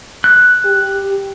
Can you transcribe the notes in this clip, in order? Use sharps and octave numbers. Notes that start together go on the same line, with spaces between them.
F#6
G4